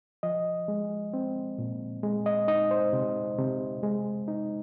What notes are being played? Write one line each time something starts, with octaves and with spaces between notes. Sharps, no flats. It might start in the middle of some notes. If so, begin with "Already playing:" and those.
F3 D#5
G#3
C4
A#2
G#3
D#5
D#4 D#5
C5
C3
C3
G#3
D#4